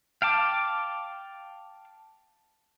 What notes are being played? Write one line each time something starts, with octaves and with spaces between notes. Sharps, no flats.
F5 G5 A5 D6